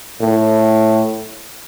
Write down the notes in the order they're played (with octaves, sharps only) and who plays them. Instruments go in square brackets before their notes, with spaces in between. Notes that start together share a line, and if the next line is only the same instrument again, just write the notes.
[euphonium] A2